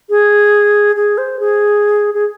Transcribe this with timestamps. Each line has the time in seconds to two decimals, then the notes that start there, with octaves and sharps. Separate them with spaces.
0.10 G#4
0.96 G#4
1.18 C5
1.40 G#4
2.14 G#4